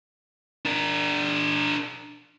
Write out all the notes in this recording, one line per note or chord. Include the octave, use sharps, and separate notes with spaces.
D4 A#4